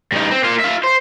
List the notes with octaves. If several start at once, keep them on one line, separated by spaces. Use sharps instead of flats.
G2 D#4
C4
A#3 F4
F4 E5
C5